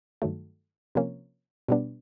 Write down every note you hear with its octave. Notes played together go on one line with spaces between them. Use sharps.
G2 D#3 F#3 A3
C3 F3 A#3 C#4
B2 G3 B3 D4